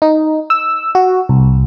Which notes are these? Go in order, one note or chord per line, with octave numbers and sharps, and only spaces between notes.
D#4
E6
F#4
C2